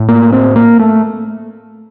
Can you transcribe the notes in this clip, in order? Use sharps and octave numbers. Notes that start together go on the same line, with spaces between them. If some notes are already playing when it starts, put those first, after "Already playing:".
Already playing: A2
A#3
C4
A#3
A3